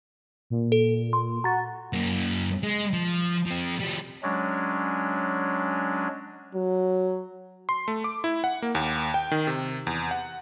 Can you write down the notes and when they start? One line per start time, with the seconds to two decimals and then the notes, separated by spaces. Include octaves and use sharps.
0.50 A#2
0.72 A4
1.13 C6
1.44 F#4 A#5 A6
1.93 F#2 A#3
2.63 G#3
2.93 F3
3.46 F3 C4
3.80 F3 G3
4.23 F#3 G#3 C#4 D4
6.54 F#3
7.69 C6
7.88 A3
8.04 D6
8.24 E4
8.44 F#5
8.62 A#3
8.75 D#2
9.14 G5
9.31 D#3
9.47 C3
9.87 E2
10.11 F#5